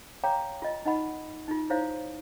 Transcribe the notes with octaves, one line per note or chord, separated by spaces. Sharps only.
C#5 F5 G5 A#5 D6
F4 D#5
D#4 D#5 F#5 B5
D#4 F4
D#4 E4 C5 C#5 F5